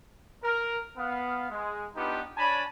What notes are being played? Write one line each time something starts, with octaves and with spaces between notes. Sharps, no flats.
A#4
B3 F5
G#3
B3 D4 D#4 F4 G4 B4
D4 C#5 G#5 A5 B5